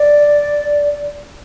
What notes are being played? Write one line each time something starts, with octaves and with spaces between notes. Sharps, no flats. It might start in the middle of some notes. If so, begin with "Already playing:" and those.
Already playing: D5